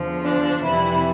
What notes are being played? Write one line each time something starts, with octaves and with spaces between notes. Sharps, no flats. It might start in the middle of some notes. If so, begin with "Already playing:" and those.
Already playing: E2 D3 F3
D4
F2 C3 E3 G3 E4